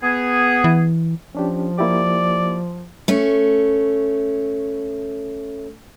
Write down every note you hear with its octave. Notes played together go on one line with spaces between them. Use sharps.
B3 G#4
E3
F3 C#4 D4 G4
A#3 E4 G4 D5
A3 C#4